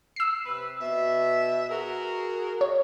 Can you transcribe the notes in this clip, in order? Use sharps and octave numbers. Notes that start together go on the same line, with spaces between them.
E6 C7
C3 B4
B2 E5
F#4 G#4 A#4
C#5